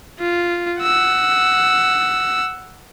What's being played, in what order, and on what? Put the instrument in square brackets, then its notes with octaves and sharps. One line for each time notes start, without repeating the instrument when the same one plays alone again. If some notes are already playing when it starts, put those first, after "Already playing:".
[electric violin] F4
F#5 E6